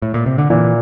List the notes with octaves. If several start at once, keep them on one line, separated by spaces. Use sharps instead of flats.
A2
A#2
C3
D3
A#2 E3